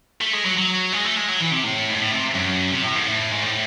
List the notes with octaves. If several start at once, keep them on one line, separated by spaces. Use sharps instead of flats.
A3
G#3
F#3
F#3
G#3
A3
G#3
F#3
E3
C3
A2
G#2
A2
C3
F#2
C3
A2
G#2
A2
G#2
A2